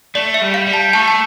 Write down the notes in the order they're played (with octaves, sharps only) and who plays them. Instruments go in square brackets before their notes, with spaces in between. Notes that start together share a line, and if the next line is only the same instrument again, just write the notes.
[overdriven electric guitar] A3 [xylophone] D5
[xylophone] E5
[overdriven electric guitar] G3
[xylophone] F5
[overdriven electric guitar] G3
[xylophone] A5
[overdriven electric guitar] A3 [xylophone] A5
[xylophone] A5